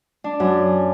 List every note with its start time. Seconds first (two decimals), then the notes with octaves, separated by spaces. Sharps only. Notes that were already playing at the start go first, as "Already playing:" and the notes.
0.24 D4
0.40 F#2